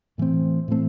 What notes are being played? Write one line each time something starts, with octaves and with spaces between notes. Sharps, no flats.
A2 E3 A3 C4
A2 E3 A3 C4